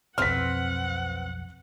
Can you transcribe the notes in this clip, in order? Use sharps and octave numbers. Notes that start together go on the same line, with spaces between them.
B1 F2 C4 B4 F#5 F6 B6